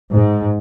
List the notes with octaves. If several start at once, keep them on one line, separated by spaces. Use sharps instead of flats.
G#2